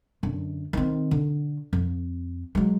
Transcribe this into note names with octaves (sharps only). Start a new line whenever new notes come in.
F#2 D3
D#3 C4
D3
F2
F#3 G#3